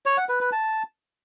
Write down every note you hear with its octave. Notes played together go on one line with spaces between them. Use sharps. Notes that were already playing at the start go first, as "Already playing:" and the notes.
C#5
F#5
B4
B4
A5